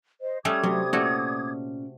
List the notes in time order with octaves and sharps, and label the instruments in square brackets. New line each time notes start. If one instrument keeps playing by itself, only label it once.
[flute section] C5 D#5
[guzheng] G3 A3 C#4 [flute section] D6 D#6 G#6
[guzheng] C3 [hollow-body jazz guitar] F#3 A3
[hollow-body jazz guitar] A#2 C#4 D5 [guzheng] A3 F#4